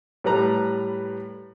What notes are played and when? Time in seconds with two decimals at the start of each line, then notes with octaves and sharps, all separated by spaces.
0.24 A2 G3 B4 A#5